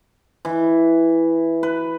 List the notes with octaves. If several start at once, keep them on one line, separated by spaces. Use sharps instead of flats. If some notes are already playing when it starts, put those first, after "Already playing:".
E3
B4